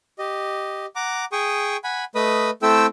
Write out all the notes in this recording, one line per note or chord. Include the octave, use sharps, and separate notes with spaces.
G4 D#5
F#5 A#5 D6
G#4 G5 C#6 D#6
F#5 G#5 B5
A3 B4 D#5 B5 D#6
A3 C4 E4 A4 G5 E6